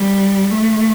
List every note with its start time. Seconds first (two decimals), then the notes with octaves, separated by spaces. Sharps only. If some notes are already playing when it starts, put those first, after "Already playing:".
Already playing: G3
0.51 A3